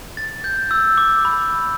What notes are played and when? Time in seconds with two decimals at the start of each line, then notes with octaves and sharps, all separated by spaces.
0.17 A6
0.44 G6
0.71 E6
0.98 D6
1.25 B5